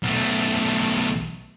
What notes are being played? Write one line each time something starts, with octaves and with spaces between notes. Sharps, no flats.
B1 A3